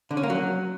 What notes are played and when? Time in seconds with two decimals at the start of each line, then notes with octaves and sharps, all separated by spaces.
0.11 D3
0.17 C#4
0.23 A#3
0.30 F#3